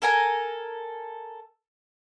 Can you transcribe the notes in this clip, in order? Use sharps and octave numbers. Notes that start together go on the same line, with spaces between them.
A4 A#4 G#5 A#5